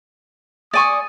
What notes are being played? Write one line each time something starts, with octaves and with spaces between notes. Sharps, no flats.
D5 G#5 C#6 D#6